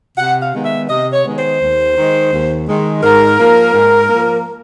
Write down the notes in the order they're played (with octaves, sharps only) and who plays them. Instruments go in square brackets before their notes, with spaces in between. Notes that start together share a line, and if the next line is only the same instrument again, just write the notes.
[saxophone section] C3 F#5
F5
D#3 G#3 B3
E5
C3 D#5
C#5
D#3 G#3 B3
C5
D#2
D#3 G#3
D#2
D#3 G#3
G#2 A#4
F3 A#3
G#2
F3 A#3